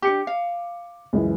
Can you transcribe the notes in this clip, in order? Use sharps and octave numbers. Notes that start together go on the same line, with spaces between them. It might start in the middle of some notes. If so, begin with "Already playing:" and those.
D4 G4 D6 C#7
F5
C#2 F#2 E3